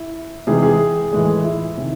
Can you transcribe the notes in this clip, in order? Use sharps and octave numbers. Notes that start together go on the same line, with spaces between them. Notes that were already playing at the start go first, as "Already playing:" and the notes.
Already playing: E4
C3 E3 G#3 G#4
G#4
A2 E3 G#3
E4
C3 D#3